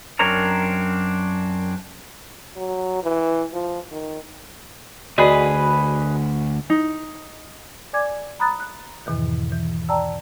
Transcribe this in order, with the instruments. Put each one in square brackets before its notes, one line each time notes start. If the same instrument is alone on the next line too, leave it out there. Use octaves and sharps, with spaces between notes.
[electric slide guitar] F#2 C4 D4 A#4 C#5 A#5
[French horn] F#3
E3
F3
D#3
[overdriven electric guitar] D2 [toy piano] F#4 D5 D#5 [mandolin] G#4 B4
[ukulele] D#4
[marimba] D5 G#5 D6 G#6
A#5 B5 D#6 F#6 A6
F#6
E2 G#2 B2 D#3 E3
E3
D5 G5 A5 A#5 E6